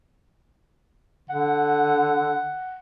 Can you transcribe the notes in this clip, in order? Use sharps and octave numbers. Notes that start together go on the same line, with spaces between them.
D3 F#5